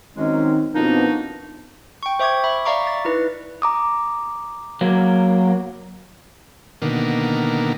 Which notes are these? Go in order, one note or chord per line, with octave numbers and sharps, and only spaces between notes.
F#2 D#3 G#3 C4 C#4 D#4
F2 B2 A#3 D4 D#4
G5 C#6
C5 E5 C#6 D6 G#6
E5 B5
D5 E5 F5 A#5 C#6 D6
A6
D#4 E4 B4
A#5 D6 D#6
F#3 A#3
B2 D3 D#3 A#3